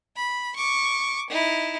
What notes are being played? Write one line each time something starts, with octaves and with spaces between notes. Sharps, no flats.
B5
C#6 D6
D#4 E4